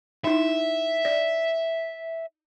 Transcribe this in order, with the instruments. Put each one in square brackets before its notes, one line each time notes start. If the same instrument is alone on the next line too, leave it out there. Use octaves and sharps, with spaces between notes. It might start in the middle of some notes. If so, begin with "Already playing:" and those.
[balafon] D#4 E4 [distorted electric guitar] E5
[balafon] D5